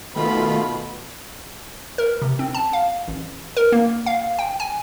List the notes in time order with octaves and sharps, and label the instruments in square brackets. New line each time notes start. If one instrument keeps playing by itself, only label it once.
[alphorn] B2 [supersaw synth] D#3 F4 [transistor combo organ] A3 [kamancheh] B5
[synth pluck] A#4
C3
C4
A5
F5
A1
A#4
A#3
F5
G5
G#5